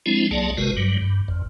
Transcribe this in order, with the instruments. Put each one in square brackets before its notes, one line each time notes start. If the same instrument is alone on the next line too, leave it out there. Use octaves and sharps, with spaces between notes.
[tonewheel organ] F3 G#3 C4 D4 E4
C2 F#3 A#3 G#4 D5 A5
G1 C3 G#3 F#4 A#4 B4
G2 F#3 G3
G2
G1 F2